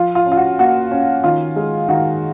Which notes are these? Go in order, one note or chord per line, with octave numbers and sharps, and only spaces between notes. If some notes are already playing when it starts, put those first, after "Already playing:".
Already playing: F3 F4
F4
C#4
F4
F#4
A#3 F#4
C#4
D#3 F4
G#3
D#3 F#4